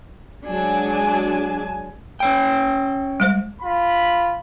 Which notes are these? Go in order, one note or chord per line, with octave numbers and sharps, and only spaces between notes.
F#3 G#3 D4 F#4 G#5 A5
C#4 C#5 G5
G3 G#3 C5
F4 B5